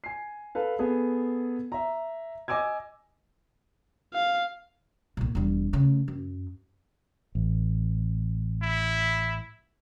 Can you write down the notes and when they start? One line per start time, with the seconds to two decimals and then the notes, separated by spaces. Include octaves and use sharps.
0.04 G#5 C7
0.55 A4 B4 F5
0.79 B3 G#4 A4
1.72 E5 A#5
2.48 D#5 G#5 D6 E6 G#6
4.13 F5
5.17 B1 A#2
5.35 E1 G3
5.73 C#3 A3
6.08 F#2
7.35 A1
8.62 E4